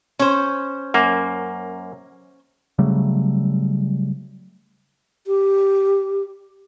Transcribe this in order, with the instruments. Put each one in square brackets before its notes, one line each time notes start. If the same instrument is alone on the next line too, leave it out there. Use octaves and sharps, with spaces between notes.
[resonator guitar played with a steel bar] C#4 C5
[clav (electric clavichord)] F#2 A#3
[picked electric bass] C#3 F#3 G3 A3
[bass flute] G4